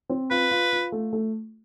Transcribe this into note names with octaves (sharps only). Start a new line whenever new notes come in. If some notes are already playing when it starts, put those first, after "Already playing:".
C4
F4 B4
F4
F4
A3
A3